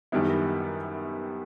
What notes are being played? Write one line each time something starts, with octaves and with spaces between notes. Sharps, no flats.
F#2 D#3 G3 B3 E4